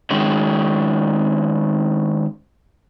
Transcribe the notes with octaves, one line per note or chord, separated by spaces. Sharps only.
D#3 G#3 C#4